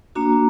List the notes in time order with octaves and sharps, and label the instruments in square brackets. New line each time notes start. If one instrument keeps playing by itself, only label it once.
[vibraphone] A#3 D4 F#4 A#5